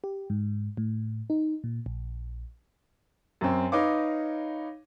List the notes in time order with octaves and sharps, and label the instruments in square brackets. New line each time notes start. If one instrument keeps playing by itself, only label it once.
[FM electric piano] G4
G#2
A2
D#4
A#2
A#1
[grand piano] F#2 C4
D#4 B4 C#5 F5 D6